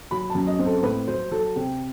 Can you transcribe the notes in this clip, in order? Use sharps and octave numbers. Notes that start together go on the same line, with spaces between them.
F#3 B5
F#2 A5
D#5
C4
A4
A2 B4
F#3 C5
F#3 A4
C3 G4